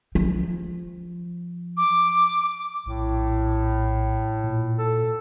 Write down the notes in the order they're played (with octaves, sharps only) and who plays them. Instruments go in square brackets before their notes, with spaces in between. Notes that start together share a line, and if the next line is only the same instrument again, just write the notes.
[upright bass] F3
[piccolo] D6
[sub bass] A#1 [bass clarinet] A2
[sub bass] A#2
[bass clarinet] A4